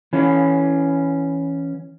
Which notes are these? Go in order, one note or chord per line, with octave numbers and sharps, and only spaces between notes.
E3 C#4